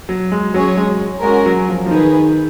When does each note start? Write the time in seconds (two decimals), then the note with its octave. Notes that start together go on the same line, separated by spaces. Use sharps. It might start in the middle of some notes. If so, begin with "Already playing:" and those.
0.09 F#3
0.32 G#3
0.54 F#3 C#4 G#4 C#5
0.77 G#3
1.22 G#3 C#4 F#4 A#4
1.46 F#3
1.69 F3
1.86 F3
1.91 D#3 D#4 G#4 B4